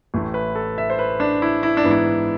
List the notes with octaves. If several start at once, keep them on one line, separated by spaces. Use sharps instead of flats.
A1 A2 E3 A3
B4
A4
E5
C5
B4
D4
E4
E4
D4
G#2 E3 B3
E4